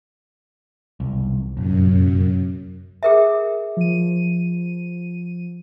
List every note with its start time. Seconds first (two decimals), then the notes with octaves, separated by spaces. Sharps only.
1.00 E1 C2
1.57 F1 A#1 F#2
3.03 G#4 A#4 E5
3.77 F3 D#7